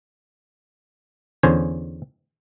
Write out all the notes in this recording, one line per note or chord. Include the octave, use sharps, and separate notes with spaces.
E2 D3 C#4 C5 G#5